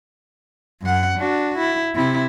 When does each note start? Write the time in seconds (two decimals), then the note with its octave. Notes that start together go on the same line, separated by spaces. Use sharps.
0.81 F#2 F#5
1.18 D4 F#4
1.58 E4
1.95 C3 E4